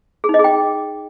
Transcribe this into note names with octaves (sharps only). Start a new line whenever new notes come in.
G#4
D#4
D#5
G#4
G5